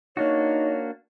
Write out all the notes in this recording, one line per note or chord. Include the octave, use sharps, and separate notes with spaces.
A#3 D4 D#4 F#4 C#5